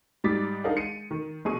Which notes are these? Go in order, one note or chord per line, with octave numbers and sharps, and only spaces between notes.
G#2 G3 D#4 D6 A6 B6
D4 D#4 G#4 A#4 F5 F#5
G#3 C#7 D#7
D#3
A#1 B2 G#4 C#6 D#7